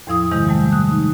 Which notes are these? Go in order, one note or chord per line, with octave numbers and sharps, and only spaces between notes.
E2 A2 F3 E4 D#6
G2 C3 D#3 G#3 E4 G6
G3 A3
D#6 F#6
D#4